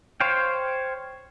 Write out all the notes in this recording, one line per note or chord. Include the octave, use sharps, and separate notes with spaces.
C5 C#5 F5 G5